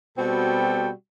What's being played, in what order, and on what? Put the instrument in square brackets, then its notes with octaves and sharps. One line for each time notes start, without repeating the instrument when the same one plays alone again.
[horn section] B2 G3 C4 F#4 A4 G5